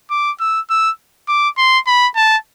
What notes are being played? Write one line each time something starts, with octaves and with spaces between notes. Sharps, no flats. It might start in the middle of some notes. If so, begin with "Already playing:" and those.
D6
E6
E6
D6
C6
B5
A5